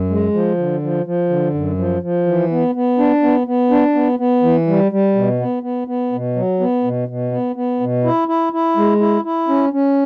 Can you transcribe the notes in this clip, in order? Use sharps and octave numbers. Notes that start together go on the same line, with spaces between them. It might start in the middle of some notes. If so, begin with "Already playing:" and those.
Already playing: F#2
G#3
F3
D3
F3
F3
D3
F#2
F3
F3
E3
B3
B3
D4
B3
B3
D4
B3
B3
E3
G3
G3
B2
B3
B3
B3
B2
F#3
B3
B2
B2
B3
B3
B2
E4
E4
E4
G#3
E4
E4
C#4
C#4